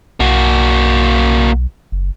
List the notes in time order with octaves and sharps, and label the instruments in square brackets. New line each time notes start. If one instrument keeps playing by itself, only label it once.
[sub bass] B1 [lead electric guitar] A#3 F#4
[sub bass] F#1